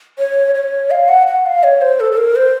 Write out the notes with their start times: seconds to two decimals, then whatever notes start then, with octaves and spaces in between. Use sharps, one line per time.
0.19 C#5
0.55 C#5
0.91 F5
1.08 F#5
1.27 F#5
1.46 F5
1.63 C#5
1.81 C5
2.00 A4
2.12 A4
2.17 A#4
2.36 C5